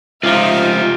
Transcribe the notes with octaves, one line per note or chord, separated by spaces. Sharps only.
C#2 F3 D#4 F4 G4 E5 F5